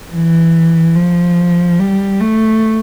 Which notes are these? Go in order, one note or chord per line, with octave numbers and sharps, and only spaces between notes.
E3
F3
G3
A3